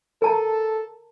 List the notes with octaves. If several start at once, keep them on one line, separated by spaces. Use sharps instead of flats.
A4 A#4 A5 A#5